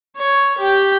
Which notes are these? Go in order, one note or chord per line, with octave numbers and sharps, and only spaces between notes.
C#5
G4 G5